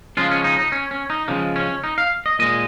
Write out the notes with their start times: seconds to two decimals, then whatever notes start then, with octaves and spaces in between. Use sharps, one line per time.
0.17 C#3 F3 G#3 F4
0.31 C#4
0.44 D#4
0.59 D#4
0.72 C#4
0.91 C#4
1.10 D#4
1.28 C#3 F3 G#3 A#3
1.56 C#4
1.84 D#4
1.98 F5
2.26 D#5
2.39 A#2 G#3 D#5